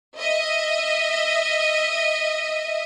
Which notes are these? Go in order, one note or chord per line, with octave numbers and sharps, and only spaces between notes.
D#5 E5